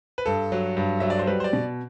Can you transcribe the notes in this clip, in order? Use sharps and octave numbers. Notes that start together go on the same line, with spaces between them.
B4
G2 A4
F#3
G2
F#3 E5
D5
C5
G3 B4
C5
D5
B2